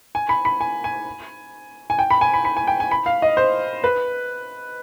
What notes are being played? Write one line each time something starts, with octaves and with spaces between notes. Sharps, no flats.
G#5
B5
B5
G#5
G#5
G#5
G5
B5
G#5
B5
B5
G#5
G5
G#5
B5
F5
D#5
C5
B4